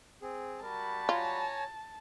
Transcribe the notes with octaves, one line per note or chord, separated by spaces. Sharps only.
C4 G#4
G3 F#4 A#4 A5 B5
F4 C#5 G#5 A#5